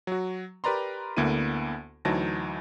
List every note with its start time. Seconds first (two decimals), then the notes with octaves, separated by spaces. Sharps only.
0.07 F#3 F#4
0.64 G4 A#4 B4 D5 A#5 C6
1.17 D2 D3 A#3 B3 E4 D#7
2.05 D2 E3 F#3 D#4 A5 A#6